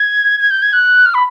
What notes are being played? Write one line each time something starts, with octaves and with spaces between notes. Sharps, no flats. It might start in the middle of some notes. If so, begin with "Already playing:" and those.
Already playing: G#6
G#6
G6
G#6
F#6
F6
B5